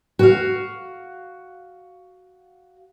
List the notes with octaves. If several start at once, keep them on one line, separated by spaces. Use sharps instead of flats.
F#4 F5